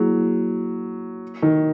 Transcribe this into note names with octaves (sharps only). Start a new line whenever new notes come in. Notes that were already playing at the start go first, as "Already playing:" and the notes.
Already playing: F#3 A#3 E4 G#4
D#3